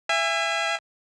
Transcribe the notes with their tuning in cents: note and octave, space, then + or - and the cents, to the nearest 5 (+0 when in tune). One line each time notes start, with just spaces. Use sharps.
E5 +20 G#5 -30